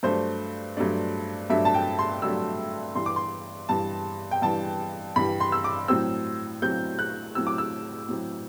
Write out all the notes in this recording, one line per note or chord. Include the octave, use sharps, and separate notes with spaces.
G2 F#3 A3 D4 C5
G2 F#3 A3 D4
G2 F#3 A3 D4 E5
A5
G5
C6
G2 F#3 A3 D4 E6
G2 E3 G3 C6
D6
C6
G2 E3 G3 A5
G5
G2 E3 G3 A5
G2 E3 G3 B5
C6
E6
D6
A2 F#3 C4 E6
A2 F#3 C4 G6
F#6
A2 F#3 C4 E6
D6
E6
A2 F#3 C4